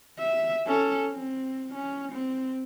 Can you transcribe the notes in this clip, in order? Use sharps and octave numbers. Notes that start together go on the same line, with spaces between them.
E5
C#4 A4
C4
C#4
C4